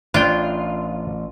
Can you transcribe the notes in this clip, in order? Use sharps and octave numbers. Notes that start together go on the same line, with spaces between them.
A1 D4 F4 G5